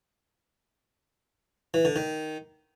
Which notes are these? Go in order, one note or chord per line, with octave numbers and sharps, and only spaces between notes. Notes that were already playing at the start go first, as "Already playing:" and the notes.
E3
D3
D#3